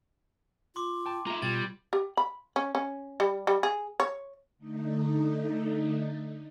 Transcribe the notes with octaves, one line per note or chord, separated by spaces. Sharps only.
F4 C6 D6
G5 A5
F4 E5 A#5
B2 G3 F4 G#6 A6
G4
B5
C#4
C#4
G3
G3
G#4
C#5
D3 A3 D#4